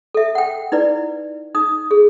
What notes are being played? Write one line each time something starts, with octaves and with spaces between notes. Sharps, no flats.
A4 E5
F#5 G5
D#4 E4 B4 D5
D#4 D#6
G#4